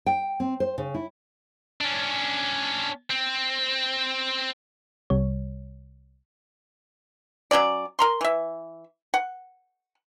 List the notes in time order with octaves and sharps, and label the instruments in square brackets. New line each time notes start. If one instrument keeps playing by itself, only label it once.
[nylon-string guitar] G5
C4
C5
C#3
E4
[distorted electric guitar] C#4 D4
C4
[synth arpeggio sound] C2 C3 G3 C#5
[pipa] F#3 A3 C#4 D5
A#4 A#5 C6
E3 E5
F#5